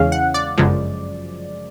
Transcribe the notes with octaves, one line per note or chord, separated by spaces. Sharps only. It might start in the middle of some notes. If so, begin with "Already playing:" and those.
Already playing: E2 C#3 E3 G#3 C#4 F5
F#5
D5
G1 F#2 C#3 F3 G#3